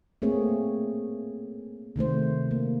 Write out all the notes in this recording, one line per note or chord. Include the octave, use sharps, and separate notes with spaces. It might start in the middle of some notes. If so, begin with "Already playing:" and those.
A3 A#3 C4 G#4 C#5
C3 D#3 A3 C5
A#3